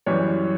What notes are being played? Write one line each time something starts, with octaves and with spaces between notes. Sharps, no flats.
F#2 E3 G3 C#5